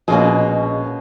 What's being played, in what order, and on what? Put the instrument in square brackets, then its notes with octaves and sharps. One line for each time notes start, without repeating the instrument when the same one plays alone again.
[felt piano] A#1 [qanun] B2 G#3 A#3 [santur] C#4 G#4